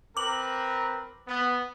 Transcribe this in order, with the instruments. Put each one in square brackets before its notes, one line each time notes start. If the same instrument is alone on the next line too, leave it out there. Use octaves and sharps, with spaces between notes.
[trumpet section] C4 A#4 B4 [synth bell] D6 F#7
[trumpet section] B3